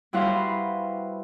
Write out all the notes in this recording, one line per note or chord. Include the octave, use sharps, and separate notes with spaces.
G3 E4 F#4 B4 C5 F5